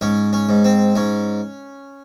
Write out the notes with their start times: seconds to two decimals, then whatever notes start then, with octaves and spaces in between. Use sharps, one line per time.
0.01 G#2 C#4
0.33 C#4
0.49 G#2
0.64 C4
0.95 G#2 C#4